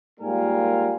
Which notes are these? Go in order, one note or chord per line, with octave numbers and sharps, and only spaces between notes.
G#2 G3 A#3 F4 A#4 G#5